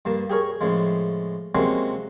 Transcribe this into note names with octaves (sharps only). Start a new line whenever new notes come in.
G2 A#3 A5
G4 G#4 A#4 C#5
A2 C#3 F3 G#3
C3 F#3 G#3 A#3 C4 C#4